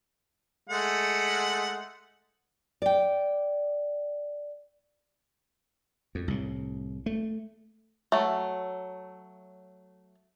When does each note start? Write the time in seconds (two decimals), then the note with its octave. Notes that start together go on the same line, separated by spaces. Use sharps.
0.70 G#3 A3 F#5
2.82 D5 G5
6.15 F2
6.28 C2 A2
7.06 A3
8.12 F#3 A3